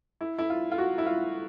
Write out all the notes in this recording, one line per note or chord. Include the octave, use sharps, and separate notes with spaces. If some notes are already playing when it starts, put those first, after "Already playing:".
E4
E4
F4
F4
F#4
E4
F4